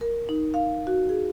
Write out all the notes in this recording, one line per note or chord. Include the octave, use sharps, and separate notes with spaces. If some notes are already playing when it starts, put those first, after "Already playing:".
A#4
D#4
F5
F#4
G#4